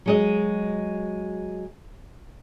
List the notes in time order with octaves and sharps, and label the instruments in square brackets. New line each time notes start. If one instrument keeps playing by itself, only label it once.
[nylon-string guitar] F#3 G#3 D#5